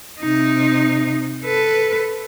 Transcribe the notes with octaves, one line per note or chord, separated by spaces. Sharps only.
C3 D#4
A4 B4